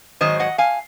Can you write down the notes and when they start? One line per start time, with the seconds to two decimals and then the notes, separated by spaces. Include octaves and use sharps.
0.21 G#2 D#3 F#3 C5 D#5
0.40 D#5 F#5
0.58 F5 G#5